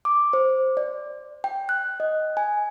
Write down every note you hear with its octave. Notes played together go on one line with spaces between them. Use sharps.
D6
C5
D5
G5
F#6
D#5
G#5